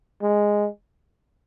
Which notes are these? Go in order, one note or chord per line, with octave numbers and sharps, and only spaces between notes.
G#3